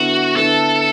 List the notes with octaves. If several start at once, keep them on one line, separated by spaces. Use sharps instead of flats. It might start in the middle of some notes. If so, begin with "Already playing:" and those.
Already playing: D3 B3 E4 F#4 B4
D3 B3 E4 A4 B4